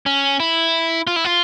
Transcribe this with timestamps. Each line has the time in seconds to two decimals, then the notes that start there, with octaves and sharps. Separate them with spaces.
0.06 C#4
0.40 E4
1.07 F4
1.16 E4
1.24 F4